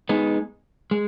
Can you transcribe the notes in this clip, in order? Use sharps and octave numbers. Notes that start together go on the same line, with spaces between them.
G#3 B3 D#4
G#3